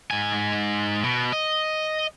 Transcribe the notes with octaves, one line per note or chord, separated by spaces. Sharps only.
G#2 G#5
B2
D#5